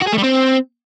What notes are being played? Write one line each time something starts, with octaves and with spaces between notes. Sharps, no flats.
F#4
G#4
A3
G3
C4